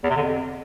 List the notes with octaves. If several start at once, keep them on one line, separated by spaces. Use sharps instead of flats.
E2
C3
D3
F2